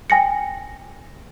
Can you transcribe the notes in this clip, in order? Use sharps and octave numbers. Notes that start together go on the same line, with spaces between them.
G5 G#5 A#6 C#7